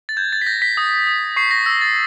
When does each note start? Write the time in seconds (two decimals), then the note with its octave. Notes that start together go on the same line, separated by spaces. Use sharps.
0.09 A6
0.17 G6 G#6
0.33 A6
0.42 B6
0.46 G6 A#6
0.62 B6
0.77 D#6
1.07 D#6
1.36 C#6 C7
1.51 A#6
1.66 E6 A#6
1.81 A6